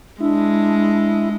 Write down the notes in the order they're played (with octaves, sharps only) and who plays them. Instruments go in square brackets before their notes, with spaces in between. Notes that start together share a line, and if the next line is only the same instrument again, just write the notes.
[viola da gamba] G#3 [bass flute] D4 [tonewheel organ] E4